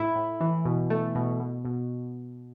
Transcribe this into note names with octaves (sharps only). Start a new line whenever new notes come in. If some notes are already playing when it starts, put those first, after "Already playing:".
Already playing: A2 E4
A2
E3
B2
A3
B2
B2
B2